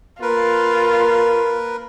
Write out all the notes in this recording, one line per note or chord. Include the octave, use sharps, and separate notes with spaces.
A#3 F4 A#4 B4